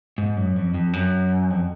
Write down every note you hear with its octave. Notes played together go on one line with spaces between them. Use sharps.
G#2
F#2
F2
F2
F#2
F2